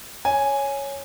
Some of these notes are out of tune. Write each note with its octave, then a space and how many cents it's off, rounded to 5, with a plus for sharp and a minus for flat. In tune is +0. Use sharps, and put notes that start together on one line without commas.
C#5 +0 G#5 +0